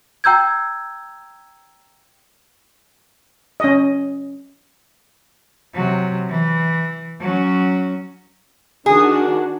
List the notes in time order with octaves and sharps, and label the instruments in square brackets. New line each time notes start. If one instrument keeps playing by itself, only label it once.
[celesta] G5 A#5 E6 G6 G#6
[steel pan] C#4 D#5
[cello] C3 F#3
E3
F#3 C#4
[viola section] D#3 D4 F#4 [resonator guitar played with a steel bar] G#4